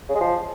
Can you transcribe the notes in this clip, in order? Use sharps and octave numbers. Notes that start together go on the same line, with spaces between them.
C#3
G#3
F3